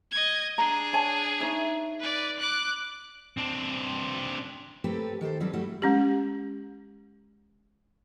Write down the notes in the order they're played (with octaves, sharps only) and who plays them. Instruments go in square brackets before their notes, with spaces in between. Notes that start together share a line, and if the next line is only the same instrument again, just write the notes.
[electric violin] D#5 G#6
[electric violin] D4 G#4 [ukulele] A#5
[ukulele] C#5 G#5 A5
D#4 C#5 E5
[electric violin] B4 D5
D6 F#6
[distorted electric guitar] C4 D4
[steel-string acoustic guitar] A3 A#3 C4 G4 A4 B4
D#3 G4 A4 C5
F#3 G3 C4 A4 B4
G3 A3 E4 F#4
[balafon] G#3 C#4 G4